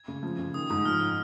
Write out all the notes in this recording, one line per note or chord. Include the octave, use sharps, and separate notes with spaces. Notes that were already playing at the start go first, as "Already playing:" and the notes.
Already playing: G#6
C#3
F3
C#3
D#3 D#6
G#2 D#6
F3 F6